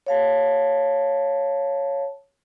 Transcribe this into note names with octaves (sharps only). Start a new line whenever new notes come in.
C#5 F5 A5